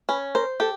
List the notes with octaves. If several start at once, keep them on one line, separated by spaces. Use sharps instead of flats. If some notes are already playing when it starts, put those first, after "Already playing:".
C#4 B4
A#4 C5
G4 A4